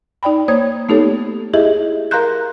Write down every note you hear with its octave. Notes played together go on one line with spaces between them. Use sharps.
D#4 D5 G5 B5
A#3 C5 C#5 D#6 G#6
A3 B3 D#4 G4 A4 C#5
E4 G4 G#4 D#5 E5
A#4 F5 A#5 C6 F#6 G6